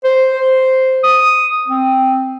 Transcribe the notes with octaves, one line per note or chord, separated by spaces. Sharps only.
C5
C5
D#6
C4